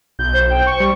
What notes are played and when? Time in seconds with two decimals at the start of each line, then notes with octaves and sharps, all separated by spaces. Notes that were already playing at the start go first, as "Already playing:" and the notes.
0.19 B1 G6
0.33 C5
0.50 G5
0.67 C#6
0.80 G3